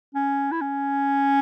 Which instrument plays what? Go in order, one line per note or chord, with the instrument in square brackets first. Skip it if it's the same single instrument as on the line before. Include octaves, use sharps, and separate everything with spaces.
[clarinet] C#4
E4
C#4